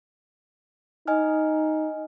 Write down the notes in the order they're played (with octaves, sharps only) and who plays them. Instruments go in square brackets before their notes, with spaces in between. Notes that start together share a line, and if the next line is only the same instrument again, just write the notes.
[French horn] D#4 [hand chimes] D#5 G#5 F6